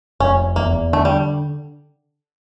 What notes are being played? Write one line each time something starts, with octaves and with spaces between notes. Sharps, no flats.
F1 C#4
E2 A#3
D3 A3
G3